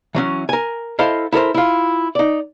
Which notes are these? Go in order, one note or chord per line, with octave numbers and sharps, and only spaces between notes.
E3 F#3 C#4
A#4 G#5
E4 A4 C5 D#5 F5
E4 A4 A#4 C5
E4 F4
D#4 D5